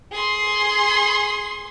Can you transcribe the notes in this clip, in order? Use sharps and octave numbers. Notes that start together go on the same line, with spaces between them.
G#4 C6